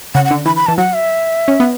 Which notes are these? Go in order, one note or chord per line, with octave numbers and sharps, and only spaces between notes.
C#3 F#5
F#5
D3
E3 B5
B5
E3 A5
F#3 F#5
E5
C#4
B3